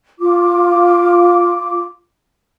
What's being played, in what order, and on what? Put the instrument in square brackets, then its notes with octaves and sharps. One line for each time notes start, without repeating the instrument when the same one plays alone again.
[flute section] F4 D6